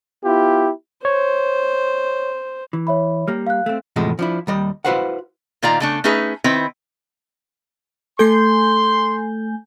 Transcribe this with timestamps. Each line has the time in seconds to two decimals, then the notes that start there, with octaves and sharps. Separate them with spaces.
0.24 B3 E4 F4 G4
1.05 C5 C#5
2.73 E3
2.87 C#5 E5 B5
3.28 G3 A#3 F6
3.47 F5 F#6
3.66 A3 C4
3.96 E2 A2 C3 F3 G#3
4.19 F3 D4 E4
4.47 D#2 G3 D#5
4.85 E4 F#4 B4 C5 F5 F#5
5.62 A#2 D#3 F4 D5 F5 A#5
5.80 C#3 A3 D4
6.04 A3 C#4 D#4 G#4 B4
6.44 D#3 C4 E4 B4
8.19 A3 A4 G#5 C6 G6